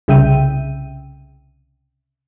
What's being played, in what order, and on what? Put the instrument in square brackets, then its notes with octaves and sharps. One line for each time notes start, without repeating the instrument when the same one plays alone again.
[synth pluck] C2 C#3 E5 G5 D#7